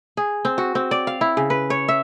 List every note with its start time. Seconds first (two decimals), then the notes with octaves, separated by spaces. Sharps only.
0.17 G#4
0.45 C4
0.58 F#4
0.75 C4
0.91 D5
1.07 F5
1.21 E4
1.37 C#3
1.50 B4
1.70 C#5
1.88 E5